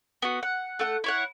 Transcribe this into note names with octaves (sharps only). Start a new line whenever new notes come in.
B3 F#4
F#5
A3 F#5
E4 C#5 F#5